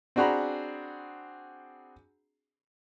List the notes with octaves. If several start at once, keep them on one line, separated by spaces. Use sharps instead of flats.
C4 D4 F#4 G#4 A#5 B5